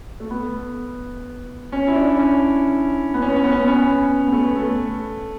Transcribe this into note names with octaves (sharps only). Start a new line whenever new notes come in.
A3
B3
C#4
E4
D4
C#4
B3
C#4
B3
C#4
B3
C#4
B3
C#4
B3
B3
A3
A3